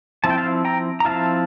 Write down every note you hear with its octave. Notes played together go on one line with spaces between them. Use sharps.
F3 C4 E4 A5
G5
F5 A5
G5 A#5
A#5
F3 C4 E4 F5 A5